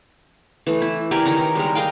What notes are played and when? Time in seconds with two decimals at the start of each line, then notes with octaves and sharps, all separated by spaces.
0.67 E3 A3
0.82 E4
1.11 G4 A#4 D5 G#5
1.25 D#3 A#4 C#5 A#5
1.55 G3 G#3 A#4
1.75 A#4 D#5 F5 G5